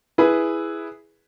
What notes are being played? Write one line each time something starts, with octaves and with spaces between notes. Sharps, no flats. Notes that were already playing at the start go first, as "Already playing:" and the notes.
E4 G#4 B4 B5